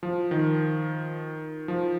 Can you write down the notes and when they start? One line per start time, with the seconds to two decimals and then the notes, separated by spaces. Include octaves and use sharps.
0.03 F3
0.31 D#3
1.68 F3